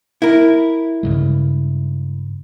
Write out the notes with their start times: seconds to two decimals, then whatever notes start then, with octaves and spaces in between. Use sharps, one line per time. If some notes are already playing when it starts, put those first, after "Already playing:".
0.22 E4 A#4
1.03 G2 C#3 G#3